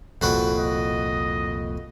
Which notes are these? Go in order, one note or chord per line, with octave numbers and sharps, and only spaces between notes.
F1 C2 F2 A#2 F#4 B4
D#5